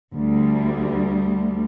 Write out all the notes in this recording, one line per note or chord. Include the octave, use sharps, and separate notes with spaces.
D2 G3